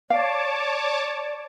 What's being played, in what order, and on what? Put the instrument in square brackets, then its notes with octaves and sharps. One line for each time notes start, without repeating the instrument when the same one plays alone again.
[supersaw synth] C#5 A5 D6 [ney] D5 [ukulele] F5